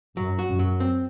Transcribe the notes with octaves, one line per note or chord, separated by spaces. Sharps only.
F#2 F#3
F#4
F#2
F#3
C4